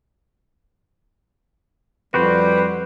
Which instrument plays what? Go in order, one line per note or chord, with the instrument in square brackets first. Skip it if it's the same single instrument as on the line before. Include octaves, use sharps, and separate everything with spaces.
[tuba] F2 [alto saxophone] G3 [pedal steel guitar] F#4 G4 C5 [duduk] B4